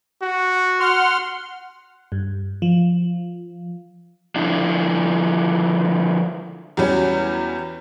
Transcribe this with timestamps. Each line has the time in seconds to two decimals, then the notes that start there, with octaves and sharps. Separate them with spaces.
0.22 F#4
0.80 F#5 C6 F6
2.12 G2
2.62 F3
4.36 D3 F3 D4 E4
6.77 E2 F#3 G3 C#4